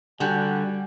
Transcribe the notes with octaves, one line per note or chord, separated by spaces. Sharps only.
D3 G3 F#4 G4 G#5